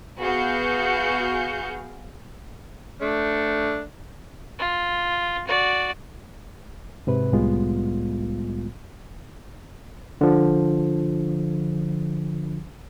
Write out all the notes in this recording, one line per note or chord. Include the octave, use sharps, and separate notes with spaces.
B3 F#4 G#4 F5 G6 C#7
A3 D4
F4
F#4 D5
G#2 C3 B4
C2 A2 G3 G#3 B3 F4
D3 F3